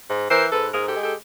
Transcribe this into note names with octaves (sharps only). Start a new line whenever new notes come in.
G#2
E3 A#4 C5
G#2 A4 B4
G#2 G#4 A#4
G4 A4
G#3
G4 A4